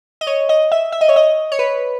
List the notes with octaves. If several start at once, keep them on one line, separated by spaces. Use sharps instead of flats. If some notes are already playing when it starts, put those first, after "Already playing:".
D#5
C#5
D#5
E5
E5
D#5
C#5
D#5
C#5
B4